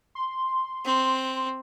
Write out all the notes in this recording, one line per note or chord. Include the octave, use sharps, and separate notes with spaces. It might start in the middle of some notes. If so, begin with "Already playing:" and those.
C6
C4